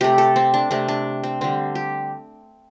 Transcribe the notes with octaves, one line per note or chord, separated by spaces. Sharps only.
C3 A3 G4
A4
C4
D4
C3 A3 D4
D4
C4
D3 G3 C4
G4